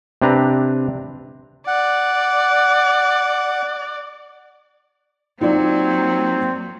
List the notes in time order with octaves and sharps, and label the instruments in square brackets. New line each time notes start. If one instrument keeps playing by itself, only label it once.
[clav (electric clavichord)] C3 C4 D4 B4 A#5
[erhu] D5 [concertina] F#5
[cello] F#3 A#3 [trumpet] C4 [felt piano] D#4 F4 D5